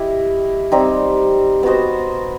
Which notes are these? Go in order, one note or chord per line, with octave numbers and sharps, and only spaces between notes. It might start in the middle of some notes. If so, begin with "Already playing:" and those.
Already playing: E4 G4 D#5
G3 C4 D#4 G4
B3 F#4 C5 D#5